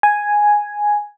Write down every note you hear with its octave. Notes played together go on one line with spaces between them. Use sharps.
G#5